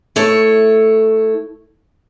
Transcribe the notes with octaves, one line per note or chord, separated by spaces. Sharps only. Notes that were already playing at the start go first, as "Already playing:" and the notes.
A3 E4 C#5